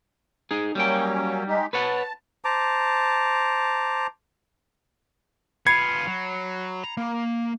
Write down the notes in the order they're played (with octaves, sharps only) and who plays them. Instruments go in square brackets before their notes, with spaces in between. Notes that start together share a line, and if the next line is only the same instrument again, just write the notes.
[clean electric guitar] D#4 G#4
[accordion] F#3 A#3 C#4 [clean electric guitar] G3 G5
[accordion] G#3 D#4 G4
[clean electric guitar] B4 C#5 F#5 [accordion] A5
[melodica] C5 A5 A#5 D6
[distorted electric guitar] B3 F4 [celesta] B5 C7 C#7 [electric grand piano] G#6
[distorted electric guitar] F#3
A#5
A#3